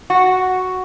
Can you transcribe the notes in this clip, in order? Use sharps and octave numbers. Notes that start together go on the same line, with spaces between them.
F#4